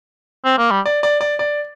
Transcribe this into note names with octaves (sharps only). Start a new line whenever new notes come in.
C4
A#3
G3
D5
D5
D5
D5